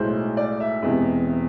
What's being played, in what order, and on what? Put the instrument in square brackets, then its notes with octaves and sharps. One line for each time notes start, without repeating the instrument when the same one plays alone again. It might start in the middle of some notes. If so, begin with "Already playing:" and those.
Already playing: [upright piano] B1 A2 G#3 C5
D5
E5
E1 E2 C3 G#3